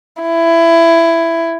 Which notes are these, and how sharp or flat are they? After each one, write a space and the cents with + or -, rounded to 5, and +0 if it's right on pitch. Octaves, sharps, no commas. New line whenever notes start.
E4 +15